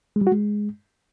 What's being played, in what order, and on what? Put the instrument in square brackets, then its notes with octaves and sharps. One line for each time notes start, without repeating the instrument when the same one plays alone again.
[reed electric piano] G#3
G3
F#4
G#3